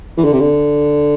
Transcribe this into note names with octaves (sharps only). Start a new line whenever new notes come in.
E3
D3
C3
D3